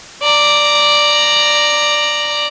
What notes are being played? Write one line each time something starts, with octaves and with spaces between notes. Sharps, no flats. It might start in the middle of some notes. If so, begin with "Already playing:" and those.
D5 A#5